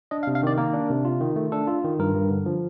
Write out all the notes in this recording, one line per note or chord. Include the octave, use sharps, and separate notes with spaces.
D4 D#5
F5
C3
F5
D#3 D5
A#3 A#4
D4
C3
F4
D#3
A3
D4 A4
F4
D#3
G2 A#4
G2
D3
F3